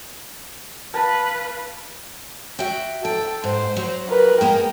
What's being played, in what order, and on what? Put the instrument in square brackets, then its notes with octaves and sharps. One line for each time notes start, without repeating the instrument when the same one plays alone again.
[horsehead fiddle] B4 F5 [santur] A5
[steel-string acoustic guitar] F#4 E5 G5
[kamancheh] A4 [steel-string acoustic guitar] G5
[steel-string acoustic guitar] G#2 [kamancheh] C5
[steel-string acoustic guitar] F#3
[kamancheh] A#4 B4
[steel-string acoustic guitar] G#3 A#3 B3 [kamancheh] G5